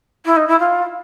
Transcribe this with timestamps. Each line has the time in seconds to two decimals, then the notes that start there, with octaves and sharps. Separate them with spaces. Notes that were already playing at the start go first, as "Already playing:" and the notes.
0.25 E4
0.36 D#4
0.47 E4
0.59 F4